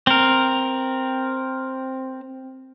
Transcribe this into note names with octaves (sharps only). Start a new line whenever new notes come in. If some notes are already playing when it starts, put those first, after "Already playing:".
C4 A#4